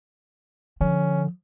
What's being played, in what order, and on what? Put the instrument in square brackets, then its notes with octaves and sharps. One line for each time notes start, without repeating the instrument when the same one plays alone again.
[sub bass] D3 [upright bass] F3 [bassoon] C#4